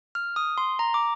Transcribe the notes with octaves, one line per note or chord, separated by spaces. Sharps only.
F6
D#6
C6
A#5
D6